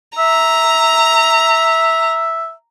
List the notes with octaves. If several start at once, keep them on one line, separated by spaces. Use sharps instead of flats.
E5 A#5